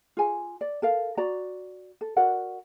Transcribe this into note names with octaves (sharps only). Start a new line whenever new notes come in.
F4 G#4 G#5
D5
A4 A#4 F5
F#4 D5 A#5
A4
F#4 A#4 D5 F#5